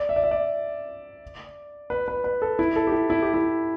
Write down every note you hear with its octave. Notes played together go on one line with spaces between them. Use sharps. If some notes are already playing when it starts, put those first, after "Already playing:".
Already playing: D5
E5
D5
E5
D5
B4
B4
B4
A4
E4
A4
G4
E4
E4
G4
E4